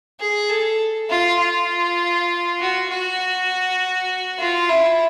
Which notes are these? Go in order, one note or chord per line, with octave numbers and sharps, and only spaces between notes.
G#4
A4
F4
F4
F#4
F#4
F4
E4